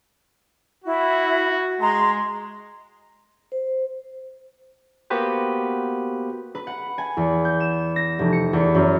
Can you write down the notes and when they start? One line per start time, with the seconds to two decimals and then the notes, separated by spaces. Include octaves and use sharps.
0.84 E4 F#4
1.80 G#3 A#5 C6
3.52 C5
5.10 A#3 B3 F#4 G4 B4 C5
6.55 B4
6.67 F#5
6.98 G#5
7.17 E2
7.45 G6
7.60 E7
7.96 A#6
8.19 F1
8.33 C#7
8.53 E2
8.75 F#2